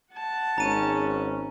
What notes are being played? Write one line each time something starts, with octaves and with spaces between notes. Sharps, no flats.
F#5 A5
G#1 G#2 C#4 A#5 D#7